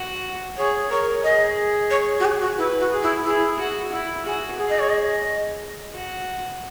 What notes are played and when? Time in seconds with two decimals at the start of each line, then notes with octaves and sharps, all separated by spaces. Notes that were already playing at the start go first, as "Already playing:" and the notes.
Already playing: F#4
0.57 G#4 C#5
0.90 A#4 C#5
1.23 G#4 D#5
1.90 C#5
2.20 F#4
2.25 G#4
2.42 F#4
2.57 E4 B4
2.80 F#4
2.91 G#4
3.02 E4
3.25 E4 G#4
3.59 F#4
3.93 E4
4.25 F#4 G#4
4.59 G#4
4.69 D#5
4.79 C#5
4.89 D#5
5.93 F#4